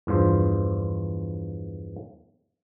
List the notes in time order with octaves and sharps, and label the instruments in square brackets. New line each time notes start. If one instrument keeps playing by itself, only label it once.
[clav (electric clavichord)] E2 G2 F3 C5